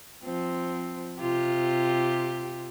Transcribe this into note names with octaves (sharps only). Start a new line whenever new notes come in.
F3 C4
C3 F4 G4